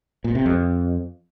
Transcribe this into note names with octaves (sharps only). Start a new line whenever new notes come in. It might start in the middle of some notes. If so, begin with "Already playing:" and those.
A#2
C3
F2